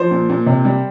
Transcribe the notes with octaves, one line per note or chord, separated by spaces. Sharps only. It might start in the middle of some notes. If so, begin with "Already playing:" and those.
Already playing: F3 C5
A#2
A#2
C3
G3